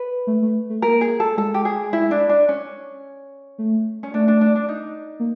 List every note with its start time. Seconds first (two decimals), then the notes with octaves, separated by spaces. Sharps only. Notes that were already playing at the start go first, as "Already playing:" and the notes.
Already playing: B4
0.27 A3
0.42 A3
0.70 A3
0.82 A#3 A#4
1.01 G#4
1.20 A4
1.37 G#3 A4
1.54 G4
1.65 G#4
1.93 E4
2.11 D4
2.29 D4
2.49 C#4
3.58 A3
4.03 C#4
4.14 A3 D4
4.28 D4
4.41 D4
4.56 D4
4.69 D#4
5.20 A#3